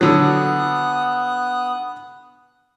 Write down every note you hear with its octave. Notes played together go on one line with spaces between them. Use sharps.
D3 F#3 B3 D#6 F#6